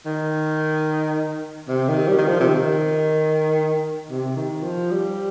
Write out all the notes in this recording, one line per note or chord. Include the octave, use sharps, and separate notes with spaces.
D#3
C3
D#3
G3
D#3
F3
C3
D#3
C3
D#3
F3
G3